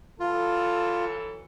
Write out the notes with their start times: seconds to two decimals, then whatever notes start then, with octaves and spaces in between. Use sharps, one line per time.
0.20 E3 F#3 F4 A4